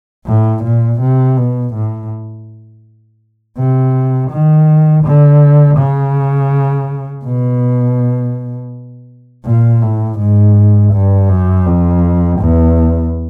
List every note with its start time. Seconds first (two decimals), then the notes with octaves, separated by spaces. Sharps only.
0.27 A2
0.64 A#2
1.01 C3
1.37 B2
1.74 A2
3.58 C3
4.31 D#3
5.04 D3
5.78 C#3
7.25 B2
9.46 A#2
9.82 A2
10.19 G#2
10.93 G2
11.30 F#2
11.66 F2
12.40 E2